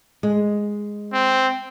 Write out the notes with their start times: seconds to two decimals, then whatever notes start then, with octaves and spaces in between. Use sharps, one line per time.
0.23 G#3
1.13 C4